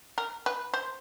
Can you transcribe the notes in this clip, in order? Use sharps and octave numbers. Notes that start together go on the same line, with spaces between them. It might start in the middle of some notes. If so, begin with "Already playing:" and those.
A#4
B4
C5